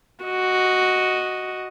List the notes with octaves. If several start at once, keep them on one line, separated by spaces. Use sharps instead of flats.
F#4 D#5